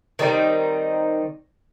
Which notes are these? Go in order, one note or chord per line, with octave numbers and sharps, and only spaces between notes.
D#3 G3 C4 D#4